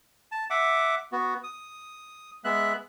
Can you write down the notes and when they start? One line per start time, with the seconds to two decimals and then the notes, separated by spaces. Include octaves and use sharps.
0.32 A5
0.50 E5 F#5 D6
1.12 B3 F#4
1.44 D#6
2.44 G#3 B3 E5 F#6